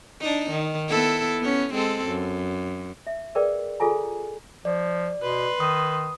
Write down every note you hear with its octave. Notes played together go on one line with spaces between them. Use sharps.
D4 D#4
D#3
B3 E4 A4
B3 C#4
G#3 C4 A4
F#2
E5
G#4 A#4 B4 D5 G5
F4 G#4 A4 G#5 A#5
F3 D5
B2 B4 C6
D#3 D#6